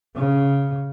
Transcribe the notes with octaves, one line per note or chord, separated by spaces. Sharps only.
C#3